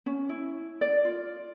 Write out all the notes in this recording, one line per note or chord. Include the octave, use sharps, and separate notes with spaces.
C#4
E4
D5
F4